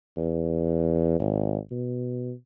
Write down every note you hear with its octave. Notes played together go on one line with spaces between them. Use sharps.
E2
G#1
B2